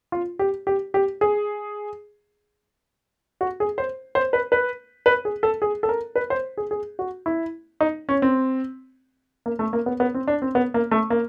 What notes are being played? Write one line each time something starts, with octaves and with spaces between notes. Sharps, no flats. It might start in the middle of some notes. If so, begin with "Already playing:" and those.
F4
G4
G4
G4
G#4
F#4
G#4
C5
C5
B4
B4
B4
G#4
A4
G#4
A4
A#4
B4
C5
G#4
G#4
F#4
E4
D#4
C#4
C4
A#3
A3
A#3
B3
B3
C4
D4
C4
B3
A#3
A3
A#3